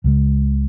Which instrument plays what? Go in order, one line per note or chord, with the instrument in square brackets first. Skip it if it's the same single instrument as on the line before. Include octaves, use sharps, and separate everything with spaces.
[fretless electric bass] C#2 C#3 G#3